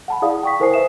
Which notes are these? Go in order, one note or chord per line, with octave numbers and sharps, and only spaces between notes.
F#5 A5 B5
E4 G#4 D5 F5 D#6
G5 C#6 B6
E4 A#4 C5 G#5 D#6 C7
B4 C5 E5 E7